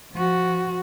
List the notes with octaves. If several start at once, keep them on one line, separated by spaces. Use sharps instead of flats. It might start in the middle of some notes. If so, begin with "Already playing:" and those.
F3 F#4